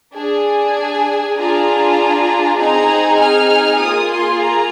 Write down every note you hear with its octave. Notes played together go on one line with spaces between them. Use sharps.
D4 G#4
G#5
D4 F4 G#4 A#5
C4 D#4 G#4 A#5
F6
A#3 F4 G#4 D#6
C6
A#5